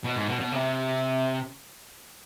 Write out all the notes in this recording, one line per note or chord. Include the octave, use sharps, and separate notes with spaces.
B2
G#2
B2
B2
C3